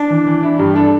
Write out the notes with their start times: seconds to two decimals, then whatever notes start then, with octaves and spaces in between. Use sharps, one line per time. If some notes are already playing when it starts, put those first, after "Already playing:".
Already playing: D4
0.10 E3
0.27 E3
0.43 D4 E4
0.59 G2 G4
0.75 D4 A4